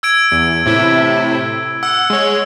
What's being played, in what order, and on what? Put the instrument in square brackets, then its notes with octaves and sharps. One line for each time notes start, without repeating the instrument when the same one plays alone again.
[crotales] E6 G#6 D7
[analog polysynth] E2
A2 C3 E4
[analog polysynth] F#5 [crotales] E6
[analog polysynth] G#3 C#5